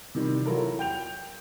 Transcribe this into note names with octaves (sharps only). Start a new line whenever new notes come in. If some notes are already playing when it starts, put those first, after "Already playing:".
C3 D#3 G3
F#3 E4 F4 A4 A#4
G5 G6 F7